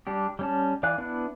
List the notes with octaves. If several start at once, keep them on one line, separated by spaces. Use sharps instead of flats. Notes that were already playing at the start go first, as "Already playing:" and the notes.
G3 D4 G4
G3 C#4 A5
E3 D5 F5 G#5 F#6
B3 D4 E4 B4